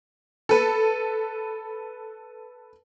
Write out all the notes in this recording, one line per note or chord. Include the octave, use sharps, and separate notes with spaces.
A4 B4